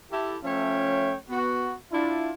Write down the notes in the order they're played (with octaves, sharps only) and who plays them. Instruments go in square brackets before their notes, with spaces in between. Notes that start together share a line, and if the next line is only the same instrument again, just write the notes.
[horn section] E4 G4 A4
F3 A3 C#4 C#5 E5 G5
B3 F#4
D4 E4 F4